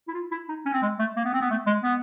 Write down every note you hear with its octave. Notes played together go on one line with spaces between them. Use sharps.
E4
F4
E4
D#4
C#4
C4
G#3
A3
A#3
B3
C4
B3
A3
G#3
B3